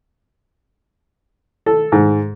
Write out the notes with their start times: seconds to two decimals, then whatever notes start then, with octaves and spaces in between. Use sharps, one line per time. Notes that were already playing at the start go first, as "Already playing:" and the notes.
1.66 A4
1.92 G#2